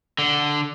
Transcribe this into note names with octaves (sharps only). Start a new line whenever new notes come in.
D3